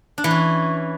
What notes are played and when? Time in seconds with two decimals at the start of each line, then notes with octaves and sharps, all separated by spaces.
0.18 D4
0.24 E3
0.31 C#4